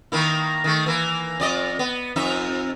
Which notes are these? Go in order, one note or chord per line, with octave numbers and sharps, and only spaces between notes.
D#3 A#3 E4
D#3 A3
E3 A#3
F2 D5 D#5
B3
F2 D#4 E5